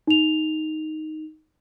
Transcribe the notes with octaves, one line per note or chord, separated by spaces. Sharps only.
D#4 F7